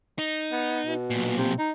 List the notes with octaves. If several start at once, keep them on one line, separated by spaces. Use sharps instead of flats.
D#4
B3
B2
B1 A#2
C3
D#4